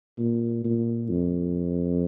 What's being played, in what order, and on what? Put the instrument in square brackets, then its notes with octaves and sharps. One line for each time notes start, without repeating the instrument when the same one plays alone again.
[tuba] A#2
A#2
F2